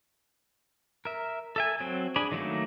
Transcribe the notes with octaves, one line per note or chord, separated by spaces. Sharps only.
A#4 E5
A4 E5 G#5
F#3 C4
D4 G#4 G#5 B5
D#3 F#3 A3 A#3 D#4